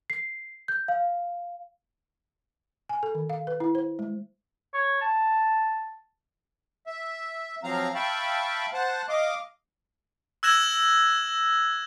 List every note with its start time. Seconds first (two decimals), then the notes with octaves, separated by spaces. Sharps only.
0.10 C7
0.68 G6
0.88 F5
2.89 G#5
3.03 A4
3.15 D#3
3.30 F5
3.47 B4
3.60 E4
3.75 C5
3.99 G#3
4.74 C#5
5.02 A5
6.87 E5
7.63 F3 F#3 C4 F5 A#5
7.95 E5 F5 G5 A5 B5 C#6
8.73 C5 F#5 A5
9.09 D#5 F5 D6
10.43 E6 F#6 G#6 A#6 E7 F#7